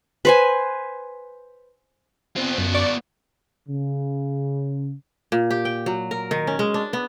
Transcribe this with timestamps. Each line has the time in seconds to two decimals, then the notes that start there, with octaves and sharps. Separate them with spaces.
0.25 B4 C5 G#5
2.36 B3 C4 F4
2.58 F#2
2.74 D5 C#6
3.69 C#3
5.32 A#2
5.51 G4
5.65 G5
5.86 F#3
6.11 A#4
6.31 D#3
6.47 C#4
6.59 G#3
6.74 D4
6.93 B3